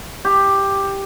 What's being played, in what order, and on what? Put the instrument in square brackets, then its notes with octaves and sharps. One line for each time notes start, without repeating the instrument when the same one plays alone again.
[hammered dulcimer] G4